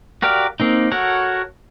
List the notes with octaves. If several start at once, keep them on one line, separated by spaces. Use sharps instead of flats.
F#4 G4 A#4 D5 F5
A#3 C4 D#4
F#4 A4 A#4 C#5 F#5